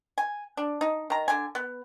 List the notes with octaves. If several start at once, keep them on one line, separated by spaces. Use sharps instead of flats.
G#5
D4
D#4
D#3 A#5
D3 G#5
B3